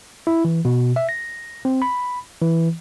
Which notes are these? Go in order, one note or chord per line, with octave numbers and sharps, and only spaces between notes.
E4
E3
B2
E5
A#6
C4
B5
E3